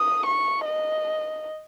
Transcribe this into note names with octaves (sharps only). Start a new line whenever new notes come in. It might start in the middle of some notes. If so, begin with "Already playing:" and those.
Already playing: D#6
C#6
D#5